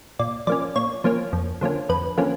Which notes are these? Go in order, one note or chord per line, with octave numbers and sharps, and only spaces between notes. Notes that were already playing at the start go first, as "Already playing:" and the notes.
A#2 D5
F3 A#3 C#4 D5
A#2 C#5
F3 A#3 C#4
F2
D3 F3 A#3 C#4
F2 B4
D3 F3 A#3 C#4